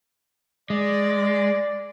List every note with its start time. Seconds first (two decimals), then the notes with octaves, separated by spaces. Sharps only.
0.70 G#3 D5